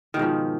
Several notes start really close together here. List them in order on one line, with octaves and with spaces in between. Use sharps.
D#3 B2 G#2 F3